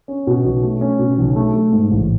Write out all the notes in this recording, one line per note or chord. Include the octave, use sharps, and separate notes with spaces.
C#4
B2
B1
A3
C#4
B2
B1
A3
A3
G#2
A1